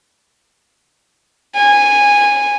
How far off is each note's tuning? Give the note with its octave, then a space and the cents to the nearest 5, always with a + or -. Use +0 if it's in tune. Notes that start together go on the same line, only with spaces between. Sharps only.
G#5 -15